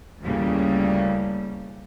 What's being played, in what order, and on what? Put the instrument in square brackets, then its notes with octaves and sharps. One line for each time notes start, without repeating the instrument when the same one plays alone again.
[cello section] D2 A2 C#3 G3 A#3